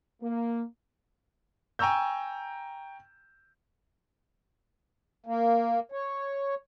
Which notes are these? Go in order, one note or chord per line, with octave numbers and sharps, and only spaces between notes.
A#3
G5 G#5 A#5 C#6 E6 G6
A#3
C#5